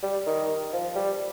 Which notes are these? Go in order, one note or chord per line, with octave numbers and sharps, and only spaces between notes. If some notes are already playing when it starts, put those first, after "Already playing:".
G3
D#3
F3
G3